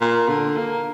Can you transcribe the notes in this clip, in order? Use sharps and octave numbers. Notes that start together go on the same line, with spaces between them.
A#2
D3
A#3